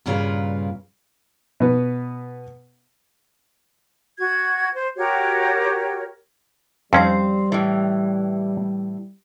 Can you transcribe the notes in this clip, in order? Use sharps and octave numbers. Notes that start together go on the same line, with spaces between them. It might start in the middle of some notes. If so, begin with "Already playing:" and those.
G2 A#2 C#3 F4 A#4 B4
B2 B3
F#4 G#6
C5
F#4 G4 A#4 C#5
F2 G3 C4 C#4 D#4 C5
A2 E3